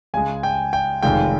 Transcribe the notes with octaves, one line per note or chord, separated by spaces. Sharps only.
C#2 C#3 G#3 G#5
G5
G5
F1 F2 D#3 G#3 G5